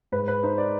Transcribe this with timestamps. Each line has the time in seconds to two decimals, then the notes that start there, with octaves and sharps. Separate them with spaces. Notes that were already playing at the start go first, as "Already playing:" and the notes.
0.12 G#2 B4
0.28 B4
0.43 D#4 C5
0.58 D5